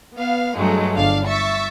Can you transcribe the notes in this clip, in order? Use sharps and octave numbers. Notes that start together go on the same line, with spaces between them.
B3 F5
G2 F#3 G#3 A3
G1 D4 F5
E5 C#6 A6